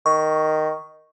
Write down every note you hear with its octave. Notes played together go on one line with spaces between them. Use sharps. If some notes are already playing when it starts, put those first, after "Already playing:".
D#3 C#6